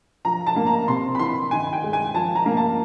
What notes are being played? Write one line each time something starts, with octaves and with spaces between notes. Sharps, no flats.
F3 A#5
A5
A#3
A#5
C3 C6
B5
E3 C6
D#3 G#5
G5
G#3
G#5
F3 A5
A#5
A#3
A5